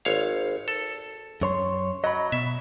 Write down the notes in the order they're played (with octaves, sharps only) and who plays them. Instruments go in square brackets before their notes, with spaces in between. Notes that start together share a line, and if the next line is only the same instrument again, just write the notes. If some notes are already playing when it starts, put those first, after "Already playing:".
[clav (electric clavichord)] G#1 C#5 F5
A4
[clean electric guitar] F#2 C#5 C6
[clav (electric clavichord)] F#3 [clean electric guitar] D#5 B5
[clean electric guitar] B2 [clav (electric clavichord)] E5